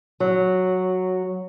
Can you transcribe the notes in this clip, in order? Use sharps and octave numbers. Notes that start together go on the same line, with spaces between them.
F#3